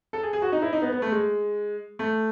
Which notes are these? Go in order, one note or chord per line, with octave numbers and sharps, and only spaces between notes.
A4
G#4
G#4
F#4
D#4
E4
D#4
B3
B3
A3
G#3
A3